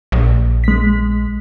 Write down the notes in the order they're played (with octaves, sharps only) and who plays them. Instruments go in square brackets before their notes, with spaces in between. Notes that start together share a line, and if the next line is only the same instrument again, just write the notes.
[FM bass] A#1
[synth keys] G#3 B6